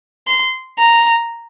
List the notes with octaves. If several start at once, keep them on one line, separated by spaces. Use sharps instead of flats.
C6
A#5